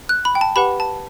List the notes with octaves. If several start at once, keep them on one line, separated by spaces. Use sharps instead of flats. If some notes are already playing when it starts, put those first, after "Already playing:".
F#6
B5
G5
A5
G4 B4 F#5 B5
A5